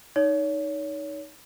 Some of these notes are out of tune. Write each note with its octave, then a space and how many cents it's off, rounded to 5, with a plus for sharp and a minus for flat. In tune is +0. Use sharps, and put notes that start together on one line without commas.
D#4 +0 C#5 +30